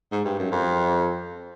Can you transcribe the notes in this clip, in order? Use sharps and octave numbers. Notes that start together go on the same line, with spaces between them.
G#2
G2
F#2
F2